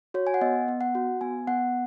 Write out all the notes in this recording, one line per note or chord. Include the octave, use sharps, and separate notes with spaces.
F#4 C#5
G#5
F#5
B3 D#5
B3
F#5
F#4
B3 G#5
B3 F#5